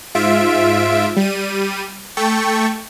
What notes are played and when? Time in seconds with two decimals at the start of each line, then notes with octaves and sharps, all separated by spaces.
0.15 G#2 F4 E5 D7
1.17 G3 D#7
2.17 A3 G5 A5 C#6